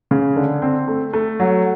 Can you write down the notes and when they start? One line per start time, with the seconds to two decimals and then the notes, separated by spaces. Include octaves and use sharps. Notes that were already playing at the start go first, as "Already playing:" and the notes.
0.11 C#3
0.36 D3
0.62 C4
0.88 A3
1.13 A3
1.40 F#3